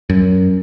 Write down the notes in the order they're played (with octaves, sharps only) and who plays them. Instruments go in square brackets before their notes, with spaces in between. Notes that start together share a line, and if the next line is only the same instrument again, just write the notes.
[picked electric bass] F#2